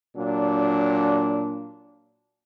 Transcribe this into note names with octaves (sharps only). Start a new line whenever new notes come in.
A#2 F#3 D4